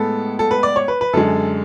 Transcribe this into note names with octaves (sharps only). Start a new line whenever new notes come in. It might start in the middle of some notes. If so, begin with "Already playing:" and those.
Already playing: A2 G#3 B3 A4
A4
B4
D5
C#5
B4
B4
F#2 D3 G#3 A4